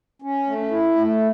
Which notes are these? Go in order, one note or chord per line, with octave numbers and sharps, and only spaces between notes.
C#4
A3
E4
A3